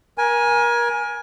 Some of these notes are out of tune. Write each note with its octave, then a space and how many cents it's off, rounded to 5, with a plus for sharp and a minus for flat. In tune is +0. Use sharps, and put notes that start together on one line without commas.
A#4 +30 G#5 +0